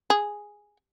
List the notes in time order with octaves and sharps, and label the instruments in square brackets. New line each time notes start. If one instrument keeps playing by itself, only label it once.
[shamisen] G#4